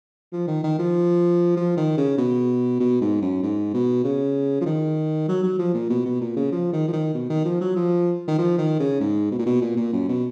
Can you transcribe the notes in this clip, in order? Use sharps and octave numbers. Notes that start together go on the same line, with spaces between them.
F3
D#3
D#3
F3
F3
D#3
C#3
B2
B2
G#2
F#2
G#2
B2
C#3
F3
D#3
F#3
F#3
F3
A#2
B2
B2
A#2
C#3
F3
D#3
F3
D#3
B2
D#3
F3
F#3
F3
D#3
F3
D#3
C#3
G#2
B2
A#2
B2
A#2
A#2
F#2
B2